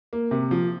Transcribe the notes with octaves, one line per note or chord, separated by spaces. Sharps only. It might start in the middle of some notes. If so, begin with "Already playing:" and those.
A#3
C3
F3